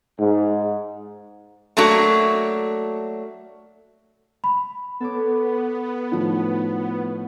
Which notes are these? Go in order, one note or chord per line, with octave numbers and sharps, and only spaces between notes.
G#2
F#3 A3 A#3 D4 F#4
B5
B3 A4 C#5 D6
A2 D#3 F3